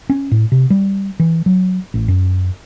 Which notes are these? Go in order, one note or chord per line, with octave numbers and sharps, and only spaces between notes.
C#4
A2
C3
G3
E3
F#3
A1
F#2